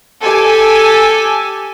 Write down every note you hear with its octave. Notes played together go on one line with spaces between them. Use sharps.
G4 A4 G#5